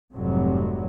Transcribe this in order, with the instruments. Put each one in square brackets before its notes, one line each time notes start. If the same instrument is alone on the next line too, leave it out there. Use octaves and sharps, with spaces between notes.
[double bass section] F1 F2 G#2 C3 F#3 G3